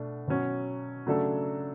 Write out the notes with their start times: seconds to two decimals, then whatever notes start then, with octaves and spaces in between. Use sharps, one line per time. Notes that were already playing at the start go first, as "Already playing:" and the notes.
Already playing: B2 A3 D4
0.28 B2 F#3 C#4
1.07 C#3 F#3 A3 D4 A4